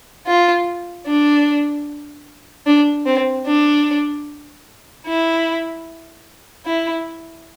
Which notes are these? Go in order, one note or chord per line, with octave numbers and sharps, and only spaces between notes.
F4
D4
D4
C4
D4
E4
E4